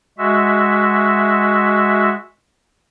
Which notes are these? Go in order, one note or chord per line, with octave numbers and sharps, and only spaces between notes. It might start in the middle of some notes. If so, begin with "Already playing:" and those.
G#3 F#4 E5